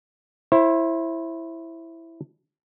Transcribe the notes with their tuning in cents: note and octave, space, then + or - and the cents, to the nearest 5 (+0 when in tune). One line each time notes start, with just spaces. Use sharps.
E4 +5 C5 +35